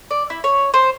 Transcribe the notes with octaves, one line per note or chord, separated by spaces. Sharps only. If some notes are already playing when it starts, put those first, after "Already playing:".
D5
E4
C#5
C5